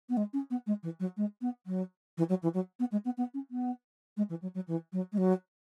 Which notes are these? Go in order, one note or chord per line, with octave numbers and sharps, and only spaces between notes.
B3
G#3
C#4
B3
G#3
E3
F#3
G#3
B3
F#3
E3
F#3
E3
F#3
B3
G#3
B3
B3
C#4
B3
G#3
E3
F#3
F#3
E3
F#3
G#3
F#3